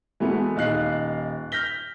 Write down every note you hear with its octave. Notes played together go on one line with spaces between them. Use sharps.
E3 G#3 A3 B3 F#4
D#1 D#4 F5 F#6 C7
F6 G6 A#6 B6 G7